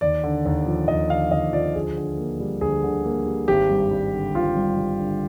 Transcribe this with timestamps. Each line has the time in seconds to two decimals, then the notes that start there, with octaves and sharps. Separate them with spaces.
0.01 D#2 D5
0.24 D3
0.46 D#2
0.66 F3
0.88 D#2 D#5
1.10 D3 F5
1.31 D#2 D#5
1.53 F3 D5
1.75 D2 G#4
1.97 D3
2.18 A#3
2.40 G3
2.61 D2 G#4
2.84 D3
3.04 A#3
3.26 G3
3.48 G#1 G4
3.70 G2
3.91 G3
4.13 D3
4.35 G#1 F4
4.56 G2
4.77 G3
4.99 D3